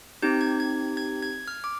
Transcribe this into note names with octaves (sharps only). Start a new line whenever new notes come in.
C4 D#4 G4 G6
G#6
G#6
G#6
G#6
F6
D6